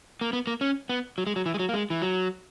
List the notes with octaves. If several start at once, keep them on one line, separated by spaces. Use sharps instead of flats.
A#3
B3
A#3
C#4
B3
F#3
G#3
F#3
E3
G#3
F#3
A#3
G#3
E3
F#3